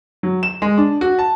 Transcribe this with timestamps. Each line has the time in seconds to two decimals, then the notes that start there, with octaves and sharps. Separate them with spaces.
0.23 F#3
0.43 E7
0.62 G#3
0.78 D4
1.01 F#4
1.19 A5